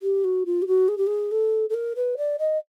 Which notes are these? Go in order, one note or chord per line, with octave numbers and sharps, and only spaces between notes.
G4
F#4
F4
G4
F#4
G#4
G4
G#4
A4
A4
A#4
B4
D5
D#5